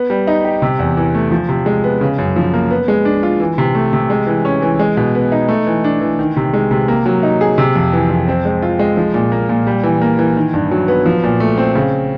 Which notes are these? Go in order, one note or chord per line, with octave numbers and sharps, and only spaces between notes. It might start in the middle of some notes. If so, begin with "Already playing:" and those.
Already playing: B3
G3
D#4
G4
C3
E2
E3
A3
F3
C3
G#3
B3
C#3
F#2
F3
A#3
B3
G#3
D4
F4
E3
C3
A3
C3
G#3
E3
C#4
E3
G#3
B2
B3
D#4
A3
E3
D4
E3
D#3
C3
G#3
C3
A#3
F#3
D#4
G#4
C3
F2
E3
F2
C4
G#3
F4
G#3
F3
A#2
A#3
A#2
G3
E3
A#3
E3
D#3
G2
F#3
B3
F3
A#2
A3
C4
C#3